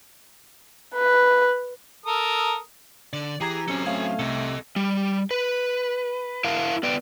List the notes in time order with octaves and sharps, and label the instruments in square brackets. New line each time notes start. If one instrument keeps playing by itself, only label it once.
[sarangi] B4
[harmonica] A4 A#4 D#6
[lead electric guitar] D3 [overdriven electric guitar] D5
[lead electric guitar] E3 [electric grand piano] G4 A#5 G#6 [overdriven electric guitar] G#4
[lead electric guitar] F#3 C4 [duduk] C#4 [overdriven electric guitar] A4 G#5
[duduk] A3 [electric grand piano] C#4 F5 G#6
[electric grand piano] C2 [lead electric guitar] C3 [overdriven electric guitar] A4 D#5
[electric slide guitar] G3
B4
E4 A#4 F5 F#5 A5
B3 B4 D5 G5